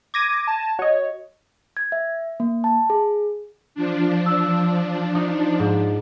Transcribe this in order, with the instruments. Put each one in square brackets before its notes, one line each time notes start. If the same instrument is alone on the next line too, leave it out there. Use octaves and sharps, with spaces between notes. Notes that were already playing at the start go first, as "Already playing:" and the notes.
[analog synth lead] D6 [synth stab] G#6 A#6 D#7
[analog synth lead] A5
[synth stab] F#4 D#5 [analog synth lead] C#5
[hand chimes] G#6
E5
A#3
A5
G#4
[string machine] F3 D4
[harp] E6
D#4
G#2